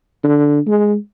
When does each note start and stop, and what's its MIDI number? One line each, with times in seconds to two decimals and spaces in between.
0.23 0.60 50
0.67 0.96 56